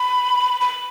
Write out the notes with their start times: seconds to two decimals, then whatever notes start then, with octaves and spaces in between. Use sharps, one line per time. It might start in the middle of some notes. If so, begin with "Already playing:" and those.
Already playing: B5
0.61 B5